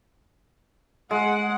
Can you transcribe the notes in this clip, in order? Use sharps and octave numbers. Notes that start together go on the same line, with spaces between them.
G#3 F#5